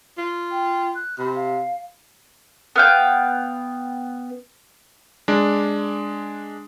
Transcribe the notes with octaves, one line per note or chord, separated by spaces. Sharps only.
F4
G5
F#6
C3 B5
F5
B3 F5 G5
G#3 D4